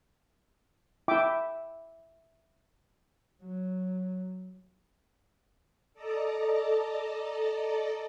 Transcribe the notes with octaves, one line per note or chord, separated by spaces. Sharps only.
E4 E5 G5 D6
F#3
A4 D5 D#5 A5 A#5